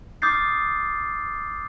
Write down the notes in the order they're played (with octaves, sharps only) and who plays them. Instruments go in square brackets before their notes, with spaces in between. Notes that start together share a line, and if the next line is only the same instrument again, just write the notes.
[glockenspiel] D6 D#6 F6 G6 A6 C7